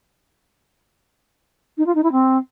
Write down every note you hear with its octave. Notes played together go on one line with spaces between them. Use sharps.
D#4
F4
D#4
E4
C4